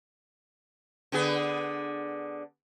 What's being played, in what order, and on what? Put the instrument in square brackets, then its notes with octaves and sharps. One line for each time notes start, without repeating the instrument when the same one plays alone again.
[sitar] D3 B3 G#4